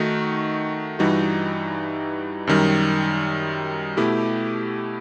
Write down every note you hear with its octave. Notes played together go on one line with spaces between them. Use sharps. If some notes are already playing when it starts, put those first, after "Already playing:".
Already playing: D#3 A3 D#4 F#4
G2 E3 G3 D#4 F#4
F#2 D#3 G3
B2 A3 E4 G4